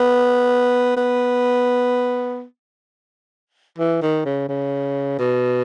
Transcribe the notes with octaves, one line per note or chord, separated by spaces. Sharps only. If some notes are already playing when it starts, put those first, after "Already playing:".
Already playing: B3
B3
E3
D#3
C#3
C#3
B2